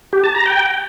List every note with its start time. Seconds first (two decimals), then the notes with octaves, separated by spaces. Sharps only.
0.13 G4
0.24 A5
0.35 A#5
0.46 G5